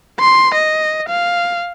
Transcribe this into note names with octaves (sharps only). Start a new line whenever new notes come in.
C6
D#5
F5